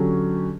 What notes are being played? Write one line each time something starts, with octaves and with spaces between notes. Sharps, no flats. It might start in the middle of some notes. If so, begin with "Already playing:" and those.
Already playing: D3 F#3 C#4 G4